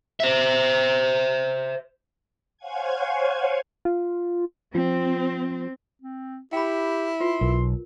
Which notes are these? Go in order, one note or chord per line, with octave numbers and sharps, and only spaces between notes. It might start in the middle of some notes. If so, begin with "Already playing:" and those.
C5 E5
C5 C#5 F5 F#5 G#5 G#6
F4
F3 C4
C4
E4 G4 G5 B5
F4 B4 C6
B1 A#4